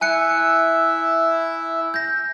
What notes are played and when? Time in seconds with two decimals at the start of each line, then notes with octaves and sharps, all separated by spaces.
0.01 E4 E5 G#5 F#6 C#7
1.94 G6 A#6